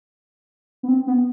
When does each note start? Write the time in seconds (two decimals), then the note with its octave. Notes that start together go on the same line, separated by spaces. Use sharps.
0.83 B3
0.88 C4
1.07 B3